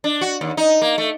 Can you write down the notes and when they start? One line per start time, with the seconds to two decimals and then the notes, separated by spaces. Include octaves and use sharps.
0.04 D4
0.21 F#4
0.41 D#2
0.57 D#4
0.82 A#3
0.98 A3